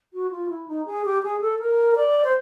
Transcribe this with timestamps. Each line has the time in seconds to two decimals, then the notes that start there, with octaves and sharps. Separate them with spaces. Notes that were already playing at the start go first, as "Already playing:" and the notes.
0.13 F#4
0.31 F4
0.49 E4
0.68 D#4
0.86 G#4
1.05 G4
1.23 G#4
1.41 A4
1.59 A#4
1.96 D5
2.24 C5